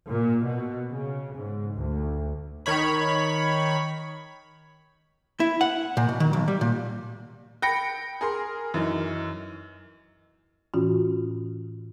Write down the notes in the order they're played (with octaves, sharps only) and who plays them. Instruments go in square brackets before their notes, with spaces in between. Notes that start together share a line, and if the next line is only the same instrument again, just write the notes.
[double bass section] A#2
B2
C#3
G#2
D2
[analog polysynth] D#3 C#5 B5
[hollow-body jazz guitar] E4
F#5
A#2
B2
D#3
B1
G3
A#2
[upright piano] G5 B5 A#6 C#7
G#4 A#4 C6
F#2 E3 D#4
[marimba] A2 E3 C#4 F4 F#4